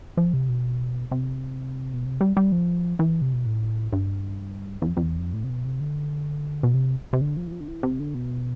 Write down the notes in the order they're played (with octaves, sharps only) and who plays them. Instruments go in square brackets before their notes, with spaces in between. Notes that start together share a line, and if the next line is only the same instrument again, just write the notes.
[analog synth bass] F3
C3
B2
C3
B2
C3
G3
G3
F3
E3
C3
B2
A2
G2
E2
F2
F2
E2
F2
A2
C3
B2
C3
D3
B2
C3
C3
D3
F3
E3
F3
D3
E3
C3
D3
B2